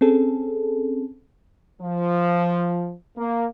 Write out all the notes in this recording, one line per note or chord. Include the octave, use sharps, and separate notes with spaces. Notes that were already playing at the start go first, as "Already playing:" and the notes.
C4 C#4 G#4 A4
F3
A#3